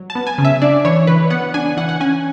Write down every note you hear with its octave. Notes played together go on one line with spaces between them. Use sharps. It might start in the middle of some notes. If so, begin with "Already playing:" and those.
Already playing: F#3
A5
B3
G#5
C#3
E5
D4 D5
E3 C#5
E3 B4
B3 F#5
D4 G#5
E3 F#5
F#5
C#4 G#5